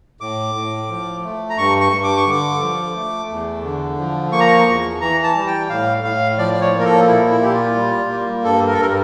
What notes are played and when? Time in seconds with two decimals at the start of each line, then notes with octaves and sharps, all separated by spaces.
0.21 A2 D6
0.55 A2
0.89 F3
1.23 A3
1.50 A#5
1.58 G2 C#6
1.81 C#6
1.92 G2
2.04 D6
2.17 C#6
2.26 D3 D6
2.60 F3
2.95 A3
3.29 E2
3.64 D3
3.98 F3
4.32 A#3 C#6
4.40 A#5
4.48 C#6
4.67 E2
5.01 E3 A#5
5.23 A5
5.35 G3
5.47 G5
5.69 A2 F5
6.04 A2 F5
6.38 F3 D5
6.54 D5
6.61 C#5
6.72 A#3
6.80 A#4
6.84 A4
7.07 A#2 E4
7.30 E4
7.41 A#2 G4
7.52 F4
7.75 G3
8.09 A#3
8.44 G2 A4
8.67 A#4
8.74 A4
8.78 G2 A#4